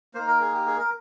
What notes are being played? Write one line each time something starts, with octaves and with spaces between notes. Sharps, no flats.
A#3 D#4 C5
A#4
G#4
G4
G#4
A#4